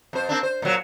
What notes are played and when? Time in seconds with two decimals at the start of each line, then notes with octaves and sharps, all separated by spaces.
0.13 F2 C5
0.29 A#3 C4 D4
0.43 C5
0.62 A#2 F3 F#3